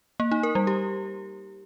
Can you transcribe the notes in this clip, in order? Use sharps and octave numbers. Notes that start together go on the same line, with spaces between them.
A#3
D#4
A#4
G3
G4